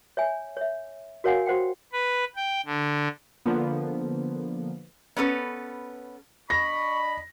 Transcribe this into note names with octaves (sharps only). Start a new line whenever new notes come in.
C#5 E5 G#5
C#5 E5
F#4 A#4 C#5 F5 F#5 G#5
F#4 C5 F#5 G5
B4
G5
D3
D3 F3 A#3 B3
B3 C#4 A4 B4
D4 D#5 B5 C#6 A#6